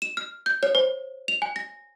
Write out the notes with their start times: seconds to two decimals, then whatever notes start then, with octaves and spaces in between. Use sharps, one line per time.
0.02 E7
0.17 F6
0.46 G6
0.63 C#5
0.75 C5
1.28 F7
1.42 G#5
1.56 A#6